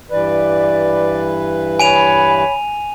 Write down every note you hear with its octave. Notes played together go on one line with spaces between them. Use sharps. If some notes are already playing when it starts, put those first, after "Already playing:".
G2 E3 B4 D5
C#5 G#5 B5 D#7 F7